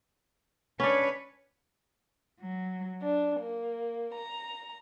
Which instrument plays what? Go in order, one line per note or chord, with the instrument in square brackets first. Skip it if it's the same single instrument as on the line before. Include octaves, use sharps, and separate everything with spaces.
[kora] C#4 D4 [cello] B4 C#5
[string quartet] F#3
D4
A#3
A#5